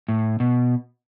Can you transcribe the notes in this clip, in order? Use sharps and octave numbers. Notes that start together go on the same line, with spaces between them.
A2
B2